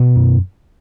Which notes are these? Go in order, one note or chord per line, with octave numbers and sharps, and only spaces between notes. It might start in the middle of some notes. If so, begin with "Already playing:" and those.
Already playing: B2 B3
F#2